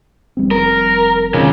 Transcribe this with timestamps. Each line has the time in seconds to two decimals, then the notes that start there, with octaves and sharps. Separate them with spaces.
0.37 F1 G3 C4
0.51 A#4
1.34 C3 D#3 F#3 G#3 C#4